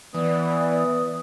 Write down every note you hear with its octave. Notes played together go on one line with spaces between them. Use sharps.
E3 B3 D5 D#6